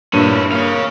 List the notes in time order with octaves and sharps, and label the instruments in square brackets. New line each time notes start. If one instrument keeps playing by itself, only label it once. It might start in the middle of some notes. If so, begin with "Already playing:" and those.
[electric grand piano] G2 [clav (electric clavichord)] A#2 [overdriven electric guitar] C#4 E4
[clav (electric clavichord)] A#3 G#4 [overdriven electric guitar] C#5 F5